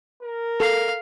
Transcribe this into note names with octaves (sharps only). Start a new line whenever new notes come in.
A#4
A4 F5